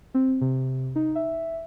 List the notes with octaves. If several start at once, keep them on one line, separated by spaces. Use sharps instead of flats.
C4
C3
D#4
E5